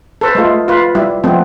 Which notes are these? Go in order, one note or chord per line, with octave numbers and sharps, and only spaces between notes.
A4 B4 C5
G#3 A3 F4
F4 B4
G3 E4
F3 G3 A3 B3 C4